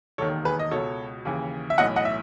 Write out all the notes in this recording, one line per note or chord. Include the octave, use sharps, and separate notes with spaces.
E1 D#2 D#3 A4 C#5
G#4 B4
D#5
C#2 B2 A4 C#5
D#2 C#3 E3
E5
B1 A2 E3 D#5 F#5
D#5 F#5
E5